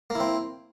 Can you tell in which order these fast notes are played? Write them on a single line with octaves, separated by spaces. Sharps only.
A#3 E4 C4